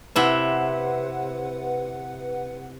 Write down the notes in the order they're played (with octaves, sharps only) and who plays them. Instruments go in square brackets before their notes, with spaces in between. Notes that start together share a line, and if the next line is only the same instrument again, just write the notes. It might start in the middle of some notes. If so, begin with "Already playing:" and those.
[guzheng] C3 E4 A5 [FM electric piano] B4 F#5